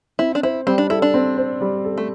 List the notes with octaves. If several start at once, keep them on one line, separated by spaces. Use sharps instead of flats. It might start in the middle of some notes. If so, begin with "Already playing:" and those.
C4 E4
D4
E4 C5
G3 C4
D4
E4 A4
D4
C4
C5
G3
A4
A3